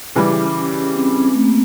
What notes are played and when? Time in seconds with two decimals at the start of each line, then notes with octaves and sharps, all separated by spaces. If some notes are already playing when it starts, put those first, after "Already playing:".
0.15 C#3 E3 G3 C#4
0.95 C4
1.34 A3
1.44 A#3